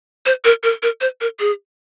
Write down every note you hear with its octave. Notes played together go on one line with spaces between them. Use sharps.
C5
A#4
A#4
A#4
C5
A#4
G#4